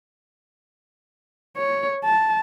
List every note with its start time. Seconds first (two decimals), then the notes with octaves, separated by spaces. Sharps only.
1.57 C#5
2.05 A5